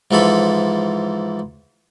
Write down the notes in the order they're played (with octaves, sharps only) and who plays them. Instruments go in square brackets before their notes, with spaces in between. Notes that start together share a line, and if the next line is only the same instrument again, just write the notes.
[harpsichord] G#2 E3 F3 A4 B5